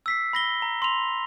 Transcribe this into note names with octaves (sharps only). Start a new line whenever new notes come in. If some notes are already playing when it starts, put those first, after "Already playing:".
E6 B6 C7
B5 A#6 G7
A#5
C6 F7